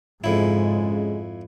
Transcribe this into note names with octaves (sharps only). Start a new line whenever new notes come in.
F2 G#2 C#3 G#3 E4